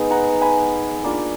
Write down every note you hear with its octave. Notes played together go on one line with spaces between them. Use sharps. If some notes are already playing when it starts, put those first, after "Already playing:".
Already playing: G#3 B3 D#4
F#5 A#5
G#5 B5
A#3 D4 F4